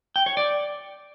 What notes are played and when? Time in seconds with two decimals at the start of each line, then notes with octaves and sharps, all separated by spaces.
0.16 G5
0.26 C#5
0.37 D5